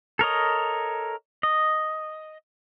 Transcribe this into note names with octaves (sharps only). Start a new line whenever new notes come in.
A4 A#4 C#5 D#5
D#5